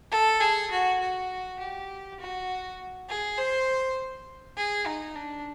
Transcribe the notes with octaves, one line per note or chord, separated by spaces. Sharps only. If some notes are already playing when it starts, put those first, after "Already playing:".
A4
G#4
F#4
F#4
G4
F#4
G#4
C5
G#4
D#4
D4